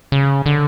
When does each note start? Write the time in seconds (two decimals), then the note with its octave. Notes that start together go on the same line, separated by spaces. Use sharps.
0.12 C#3
0.46 D3